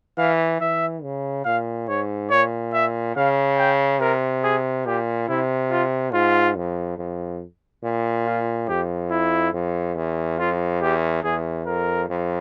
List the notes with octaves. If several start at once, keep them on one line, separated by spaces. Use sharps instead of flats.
E3 F5
E3 E5
C#3
A#2 F5
G#2 C#5
A#2 C#5
E5
C#3 F5
G5
C3 A#4
G#4
A#2 G4
C3 E4
F4
G#2 F4
F2
F2
A#2
F4
F2 G4
E4
F2
E2
F2 F4
E2 G4
E2 G#4
F2 A#4
F2